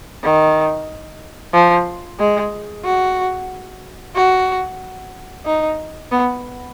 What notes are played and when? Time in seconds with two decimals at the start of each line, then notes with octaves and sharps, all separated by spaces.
0.23 D#3
1.54 F3
2.19 G#3
2.84 F#4
4.15 F#4
5.46 D#4
6.11 B3